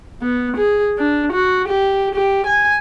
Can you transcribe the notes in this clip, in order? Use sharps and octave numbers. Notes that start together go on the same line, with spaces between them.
B3
G#4
D4
F#4
G4
G4
G#5